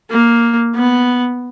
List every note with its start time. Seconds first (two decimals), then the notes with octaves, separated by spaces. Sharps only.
0.10 A#3
0.75 B3